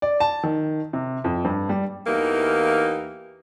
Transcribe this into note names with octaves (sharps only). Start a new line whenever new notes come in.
D5
A5
D#3
C3
F2
G2
G3
E2 E3 A#3 D#4 G4 F5